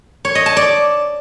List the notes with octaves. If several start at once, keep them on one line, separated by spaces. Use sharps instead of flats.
C#5
D#5
A5
D5